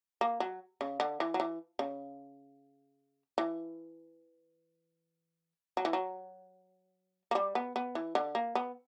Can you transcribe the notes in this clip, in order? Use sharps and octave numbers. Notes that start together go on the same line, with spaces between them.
A#3
F#3
C#3
D3
E3
F#3
E3
C#3
E3
F#3
E3
F#3
A#3
G3
B3
B3
E3
D3
A#3
B3